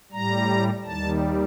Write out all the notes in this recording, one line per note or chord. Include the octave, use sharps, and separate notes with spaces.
A2 G3 A#5
D#2 D#3 G3 A5